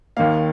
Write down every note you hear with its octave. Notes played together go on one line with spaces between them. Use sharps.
D#2 D#3 A#3 F5